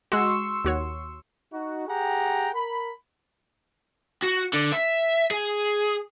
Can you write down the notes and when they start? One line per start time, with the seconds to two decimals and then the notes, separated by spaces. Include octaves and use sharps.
0.12 G#3 F#4 C6 C#6 E6
0.65 D#2 F#4 C#5
1.52 D#4 F#4
1.88 G4 G#4 F#5 G5 A#5
2.54 A#4 B5
4.24 F#4
4.54 D3
4.73 E5
5.31 G#4